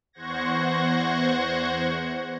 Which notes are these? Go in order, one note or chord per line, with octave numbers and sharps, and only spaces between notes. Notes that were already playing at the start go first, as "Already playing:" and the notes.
E2 C5 F#5 C#6 G#6 A#6